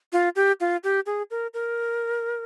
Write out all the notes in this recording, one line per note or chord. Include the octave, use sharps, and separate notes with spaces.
F4
G4
F4
G4
G#4
A#4
A#4